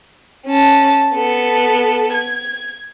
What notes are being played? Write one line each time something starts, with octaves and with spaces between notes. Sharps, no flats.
C#4 A5
B3 A4
G#6